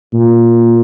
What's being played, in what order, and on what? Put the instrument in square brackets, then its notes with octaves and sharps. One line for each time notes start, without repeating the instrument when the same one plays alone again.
[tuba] A#2